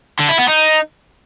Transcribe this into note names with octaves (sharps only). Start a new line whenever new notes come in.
D3
E4
B3
D#4